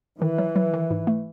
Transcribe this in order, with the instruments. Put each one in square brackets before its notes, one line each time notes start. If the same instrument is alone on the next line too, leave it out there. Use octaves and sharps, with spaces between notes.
[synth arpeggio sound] D#3 [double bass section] E3
[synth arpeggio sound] F#3
F#3
D#3
G#2
A3